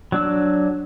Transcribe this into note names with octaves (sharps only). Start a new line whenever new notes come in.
F#3 D4 E6